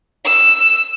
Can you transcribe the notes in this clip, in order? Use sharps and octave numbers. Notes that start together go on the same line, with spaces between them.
E6